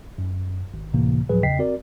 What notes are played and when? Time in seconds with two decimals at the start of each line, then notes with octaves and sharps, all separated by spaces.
0.18 F#2
0.74 G#1
0.94 C#2 A2 C3 E3 A#3
1.29 D2 A2 F3 F#3 G#4 B4
1.43 E2 C#3 D#5 G5 B6 C7
1.59 C4 F#4 A#4 D5